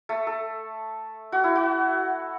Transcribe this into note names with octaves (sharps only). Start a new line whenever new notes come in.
A3
A4
F#4
E4
F#4